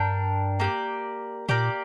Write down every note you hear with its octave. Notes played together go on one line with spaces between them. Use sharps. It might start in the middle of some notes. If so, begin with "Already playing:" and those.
Already playing: G2 D4 A#4 G5
A#3 G4 D5
A#2 A#3 G4 D5